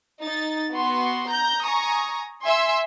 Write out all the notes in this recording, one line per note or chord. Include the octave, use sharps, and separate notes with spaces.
D#4 A6
B3 F#4 C6
A#5 G6
G#5 A#5 C#6 D#6
E5 G#5 C6